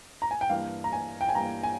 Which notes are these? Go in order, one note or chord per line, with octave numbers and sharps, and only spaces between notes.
A#5
G#5
G5
G2 E3 A#3 F5
A#5
G#5
G5
G#5
G2 E3 A#3 A#5
G#5